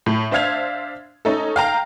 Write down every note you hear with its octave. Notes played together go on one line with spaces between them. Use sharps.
A2
D4 C5 E5 F5 G#6 F7
C#4 D#4 A4
F5 G5 A#5